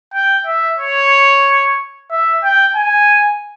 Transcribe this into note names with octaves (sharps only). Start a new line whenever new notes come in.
G5
E5
C#5
E5
G5
G#5